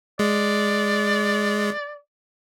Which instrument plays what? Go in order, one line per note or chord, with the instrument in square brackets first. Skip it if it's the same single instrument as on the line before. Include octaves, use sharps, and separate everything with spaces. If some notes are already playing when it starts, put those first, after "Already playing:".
[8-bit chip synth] G#3 [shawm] D5